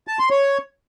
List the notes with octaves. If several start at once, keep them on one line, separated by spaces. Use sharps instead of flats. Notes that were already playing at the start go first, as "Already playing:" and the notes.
A5
C6
C#5